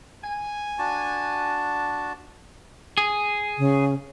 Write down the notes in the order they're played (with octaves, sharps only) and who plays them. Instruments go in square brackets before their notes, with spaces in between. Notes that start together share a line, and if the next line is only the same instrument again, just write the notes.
[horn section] G#5
[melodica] D4 F#4 A5
[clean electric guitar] G#4
[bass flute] C#3